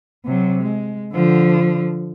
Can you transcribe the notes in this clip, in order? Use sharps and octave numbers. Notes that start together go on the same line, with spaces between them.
C3 F#3
G#3
D3 F3